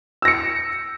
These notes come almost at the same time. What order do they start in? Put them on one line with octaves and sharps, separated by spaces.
E6 A#6 C#7